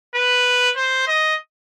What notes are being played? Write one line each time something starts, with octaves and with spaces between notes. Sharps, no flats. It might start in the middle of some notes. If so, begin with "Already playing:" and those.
B4
C5
D#5